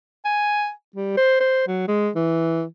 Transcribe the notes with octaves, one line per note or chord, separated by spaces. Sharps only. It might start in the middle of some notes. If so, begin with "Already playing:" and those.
G#5
G3
C5
C5
F#3
G#3
E3